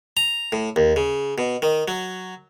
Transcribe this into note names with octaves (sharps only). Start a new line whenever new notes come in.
A#5
A2
D#2
C#3
B2
D#3
F#3